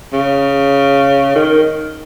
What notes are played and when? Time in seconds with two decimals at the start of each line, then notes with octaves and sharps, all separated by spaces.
0.13 C#3
1.35 D#3